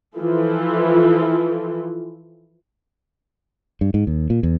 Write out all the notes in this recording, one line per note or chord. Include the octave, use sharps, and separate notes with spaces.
E3 F3 E4 F4 A4
G2
G#2
D#2
A#2
E2